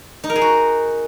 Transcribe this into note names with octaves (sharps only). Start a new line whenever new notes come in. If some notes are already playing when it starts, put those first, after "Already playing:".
D#4
A#4
G#4
F#4